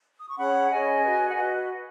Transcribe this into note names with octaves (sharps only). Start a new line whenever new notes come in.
D#6
C#6
C#4 G#4 C#5 F#5 B5
C#4 G#4 C#5 D#5 G#5
F#4 B4
F#5
F#4 B4 D#5